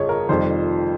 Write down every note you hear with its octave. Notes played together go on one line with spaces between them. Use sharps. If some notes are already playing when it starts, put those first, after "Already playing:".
Already playing: G1 F2 C#3 C#5 D#5
A#4
F1 F2 D#3 G3 C5